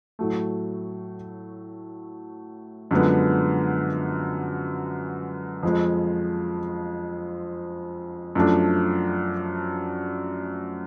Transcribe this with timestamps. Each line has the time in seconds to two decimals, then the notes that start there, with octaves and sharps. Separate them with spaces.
0.19 A2 F#3 A3
2.91 F#2 D3 F3 G#3 B3
5.63 F2 F3 G#3
8.35 F#2 F3 A3 D4